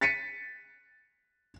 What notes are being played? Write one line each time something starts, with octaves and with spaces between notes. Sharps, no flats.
A6 B6 C#7 D#7